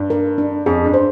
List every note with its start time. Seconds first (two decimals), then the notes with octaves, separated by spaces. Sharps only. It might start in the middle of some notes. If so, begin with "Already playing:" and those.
Already playing: G2
0.10 A#4
0.38 D4
0.66 F2 G#4
0.85 G2
0.94 C5